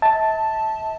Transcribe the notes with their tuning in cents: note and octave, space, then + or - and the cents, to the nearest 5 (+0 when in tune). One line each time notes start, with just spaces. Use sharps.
E5 -40 A5 +0